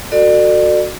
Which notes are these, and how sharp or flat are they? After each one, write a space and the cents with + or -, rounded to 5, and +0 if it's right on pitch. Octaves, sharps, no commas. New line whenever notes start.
F#4 -5 A4 +35 D5 +35